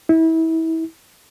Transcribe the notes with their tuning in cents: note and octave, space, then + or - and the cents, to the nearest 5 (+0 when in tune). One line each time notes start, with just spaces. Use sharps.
E4 -30